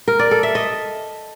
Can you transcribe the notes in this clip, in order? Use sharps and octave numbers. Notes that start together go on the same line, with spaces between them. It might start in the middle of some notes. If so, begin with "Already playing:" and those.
A#4
D5
A4
E5
D#5